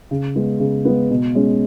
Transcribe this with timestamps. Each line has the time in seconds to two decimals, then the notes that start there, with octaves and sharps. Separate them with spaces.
0.11 C#3
0.35 G#3 B3
0.60 C#3
0.85 G#3 B3
1.10 B2
1.35 G#3 C#4